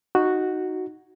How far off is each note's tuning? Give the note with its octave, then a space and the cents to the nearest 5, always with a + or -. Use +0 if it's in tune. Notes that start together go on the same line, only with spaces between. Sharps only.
D#4 +0 F#4 +0